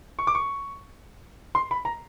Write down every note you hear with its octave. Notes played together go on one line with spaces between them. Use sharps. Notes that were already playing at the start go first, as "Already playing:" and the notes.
C#6
D6
C#6
C6
B5
A#5